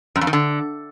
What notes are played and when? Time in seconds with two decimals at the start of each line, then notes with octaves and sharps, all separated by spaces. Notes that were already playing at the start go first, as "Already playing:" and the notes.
0.16 F#2
0.21 F2
0.27 D#3
0.33 D3